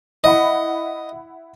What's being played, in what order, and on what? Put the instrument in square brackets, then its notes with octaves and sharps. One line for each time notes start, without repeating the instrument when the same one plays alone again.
[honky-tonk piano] E4 F#5 B5 [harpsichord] D#5